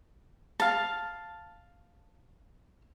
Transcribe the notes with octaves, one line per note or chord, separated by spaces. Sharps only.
F5 A5